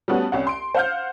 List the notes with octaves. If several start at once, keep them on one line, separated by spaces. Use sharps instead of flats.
G3 A3 B3 C#4 F#4
C2 C#4 F#5
C6 D7
C5 F5 F#5 F6 G6